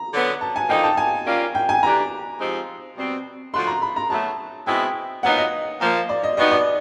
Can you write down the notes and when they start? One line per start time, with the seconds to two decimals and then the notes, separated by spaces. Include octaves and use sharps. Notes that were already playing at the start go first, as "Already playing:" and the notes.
Already playing: A#5
0.13 D3 F#3 B3
0.41 A5
0.56 G#5
0.69 D3 F3 A#3 D#4 G5
0.84 A5
0.97 G#5
1.26 A#2 G3 A#3 C#4 F4
1.55 G5
1.69 G#5
1.83 E3 A3 D4 G4 A#5
2.40 F3 G#3 C4 D#4 G4
2.96 B2 G3 C4
3.53 D3 F3 A3 D4 F#4 C6
3.67 A#5
3.82 B5
3.96 A#5
4.10 B2 F#3 A3 A5
4.67 B2 G#3 C4 E4 G5
5.23 A#2 F#3 B3 D#4 F#5
5.38 D#5
5.80 A#2 F3 A#3
6.09 D5
6.24 D#5
6.37 B2 G3 B3 D#4 D#5
6.51 D5